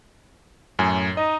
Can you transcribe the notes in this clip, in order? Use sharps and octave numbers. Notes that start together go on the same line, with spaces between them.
F#2 A2 G#5
D#4 D#5